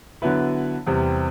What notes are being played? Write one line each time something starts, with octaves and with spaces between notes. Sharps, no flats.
D3 F#3 B3 E4 B4
E2 C3 G3